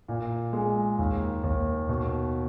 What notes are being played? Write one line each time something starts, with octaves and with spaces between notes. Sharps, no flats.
A#2
G#3
D#2
D#2
B2